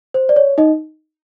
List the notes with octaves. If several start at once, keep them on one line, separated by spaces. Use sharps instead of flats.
C5
D5
C#5
D#4 D#5